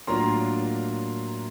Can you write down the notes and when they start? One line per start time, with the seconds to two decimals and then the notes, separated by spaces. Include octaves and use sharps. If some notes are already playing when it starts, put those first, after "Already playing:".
0.07 A2 F#3 A#3 D4 F4 A#5 C6